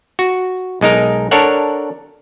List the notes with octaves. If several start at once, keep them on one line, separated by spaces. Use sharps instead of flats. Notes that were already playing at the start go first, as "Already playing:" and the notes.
F#4
B1 G#3 D#4 A#4
D4 A4 A#4 C#5 F#5